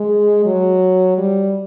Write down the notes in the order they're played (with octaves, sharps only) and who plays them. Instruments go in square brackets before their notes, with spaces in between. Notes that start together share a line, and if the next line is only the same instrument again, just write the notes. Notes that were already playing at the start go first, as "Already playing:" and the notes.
Already playing: [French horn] G#3
F#3
G3